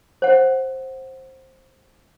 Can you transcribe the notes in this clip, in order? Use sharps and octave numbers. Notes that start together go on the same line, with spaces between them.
C5 F#5